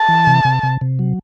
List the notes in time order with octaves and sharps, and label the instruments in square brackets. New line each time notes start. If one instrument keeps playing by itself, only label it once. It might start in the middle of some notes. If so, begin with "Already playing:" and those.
Already playing: [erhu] A5
[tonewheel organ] E3
C3
C3
C3
C3
F#3